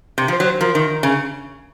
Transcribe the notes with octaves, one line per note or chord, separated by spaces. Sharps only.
C3
F3
C5
F#3
C5
F3 A#4
D#3
C#3